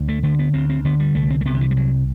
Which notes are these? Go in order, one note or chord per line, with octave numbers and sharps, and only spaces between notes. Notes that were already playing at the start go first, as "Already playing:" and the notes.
Already playing: D2
A3
D3 A3
B3
D2 C4
C4
D3 B3
G3
C2 A3
C4
A3
C3 B3
D3
E3
G3
C2 F#3